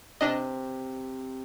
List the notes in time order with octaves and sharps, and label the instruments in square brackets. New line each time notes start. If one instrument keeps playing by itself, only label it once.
[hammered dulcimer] C3 [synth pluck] D4 D#5